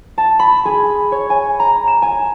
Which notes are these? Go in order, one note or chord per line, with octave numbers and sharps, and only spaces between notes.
A5
B5
G#4
C#5
G#5
A#5
E7
G#5